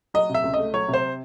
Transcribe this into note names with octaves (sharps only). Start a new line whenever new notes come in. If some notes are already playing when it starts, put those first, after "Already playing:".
F#3 D#5
C3 E5
C#2
D#5
A3
F#3 C#5
C3
C5